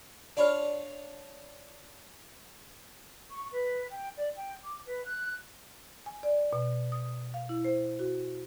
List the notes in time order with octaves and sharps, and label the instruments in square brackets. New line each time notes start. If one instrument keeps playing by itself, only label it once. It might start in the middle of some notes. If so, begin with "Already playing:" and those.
[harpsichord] D4 F4 C#5 [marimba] D5 B5 F6
[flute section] C#6
B4
G5
D5
G5
D6
B4
F#6
[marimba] G#5
D5
B2
D#6
F5
E4
C5
F#4